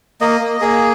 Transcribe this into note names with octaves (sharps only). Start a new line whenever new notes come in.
A#3 D#5
A#3
A#3 G#4